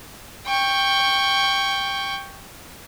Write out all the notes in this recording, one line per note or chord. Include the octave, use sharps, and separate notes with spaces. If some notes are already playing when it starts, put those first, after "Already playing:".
G5 C#6